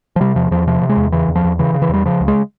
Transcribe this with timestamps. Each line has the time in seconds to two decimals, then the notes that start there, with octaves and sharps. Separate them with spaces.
0.16 F3
0.21 C3 G3
0.36 E2 F3
0.51 E2 F3
0.67 C3 F3
0.82 C3
0.89 G#3
0.97 E2
1.12 C#3 E3
1.29 E2
1.36 F3
1.44 E2
1.59 C#3 E3
1.74 C#3
1.82 E3
1.89 E2 G3
2.05 C#3 F3
2.21 C#2
2.28 G#3